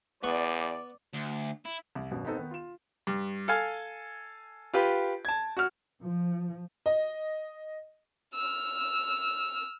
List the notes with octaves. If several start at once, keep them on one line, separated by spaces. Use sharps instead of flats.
E2 B3 D5 C#6
D2
E4
C2
G#1 F#2 B2
B3 C4 D#4 A4
D#3 B3
F4 E7
G2
A4 F5 G#5
F4 G4 B4
A5 G#6
F#4 F6
F3
D#5
E6 F6